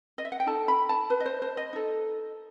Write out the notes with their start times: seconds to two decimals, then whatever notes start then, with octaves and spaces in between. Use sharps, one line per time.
0.18 D#5
0.25 E5
0.32 F#5
0.40 G5
0.46 D#4 A4 A5
0.68 B5
0.89 A5
1.10 B4
1.20 D#5
1.26 C5
1.42 C5
1.57 D#5
1.73 D#4 A4